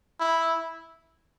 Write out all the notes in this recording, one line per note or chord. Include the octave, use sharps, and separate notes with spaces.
E4